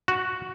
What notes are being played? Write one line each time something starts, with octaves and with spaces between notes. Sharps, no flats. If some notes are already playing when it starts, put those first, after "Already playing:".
F#4